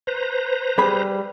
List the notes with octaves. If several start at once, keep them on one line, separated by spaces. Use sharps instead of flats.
B4 C5 A#5
G3 G#4 B5